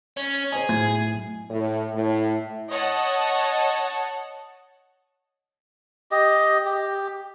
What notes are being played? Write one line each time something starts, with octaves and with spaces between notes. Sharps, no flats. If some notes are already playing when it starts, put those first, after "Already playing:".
C#4
G#4 C5 D#5
B1 A2 G#6
A2
A2
C#5 D#5 F#5 A5
G4 D#5
G4